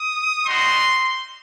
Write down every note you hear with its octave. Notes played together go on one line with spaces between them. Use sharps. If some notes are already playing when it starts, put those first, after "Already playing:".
Already playing: D#6
G3 D#4 F#4 C6